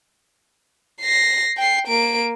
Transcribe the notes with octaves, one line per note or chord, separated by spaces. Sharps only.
A#6 C7
G5 C7
A#3 D7